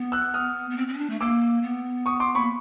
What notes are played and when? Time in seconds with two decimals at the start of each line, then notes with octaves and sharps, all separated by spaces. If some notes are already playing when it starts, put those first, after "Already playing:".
Already playing: B3
0.12 E6 F#6
0.34 D#6 F6
0.70 B3
0.77 C4
0.88 C4
0.94 C#4
0.98 D4
1.10 A3
1.20 A#3 D6 E6
1.63 B3
2.06 C#6 D#6
2.20 C6 D6
2.35 A#3 B5 C#6